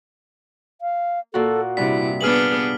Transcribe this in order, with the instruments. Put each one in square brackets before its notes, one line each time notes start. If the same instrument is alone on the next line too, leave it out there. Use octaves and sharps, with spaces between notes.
[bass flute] F5
[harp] A#2 F#4 [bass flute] A4
[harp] G2 [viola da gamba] C3 [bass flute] E4 [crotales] B6
[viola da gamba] B3 D4 G#4 [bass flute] B4 [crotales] F6 F#7